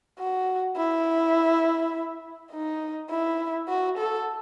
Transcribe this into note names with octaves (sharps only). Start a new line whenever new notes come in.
F#4
E4
D#4
E4
F#4
A4